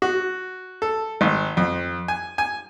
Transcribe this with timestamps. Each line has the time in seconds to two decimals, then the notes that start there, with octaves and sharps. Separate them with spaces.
0.02 F#4
0.82 A4
1.21 G#1
1.57 F2
2.08 G#5
2.38 G#5